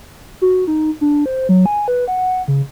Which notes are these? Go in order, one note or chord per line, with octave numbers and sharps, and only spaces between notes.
F#4
D#4
D4
C5
F#3
G#5
B4
F#5
C#3